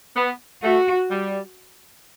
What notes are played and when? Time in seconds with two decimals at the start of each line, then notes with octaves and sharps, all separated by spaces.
0.16 B3
0.63 A3 F#4
1.10 G3